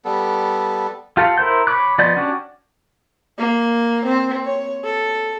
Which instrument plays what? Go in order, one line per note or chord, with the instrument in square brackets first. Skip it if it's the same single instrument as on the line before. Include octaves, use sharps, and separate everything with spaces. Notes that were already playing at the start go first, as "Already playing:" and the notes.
[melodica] G3 B3 A4
[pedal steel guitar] F4 G4 A4 F5 F#5
E4 A#4 C5 G6
C#5 B5 D6 F#6
F3 B3 D5 D#5 G6
C#4 D4 F#4 G4
[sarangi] A#3
C4
C#5
A4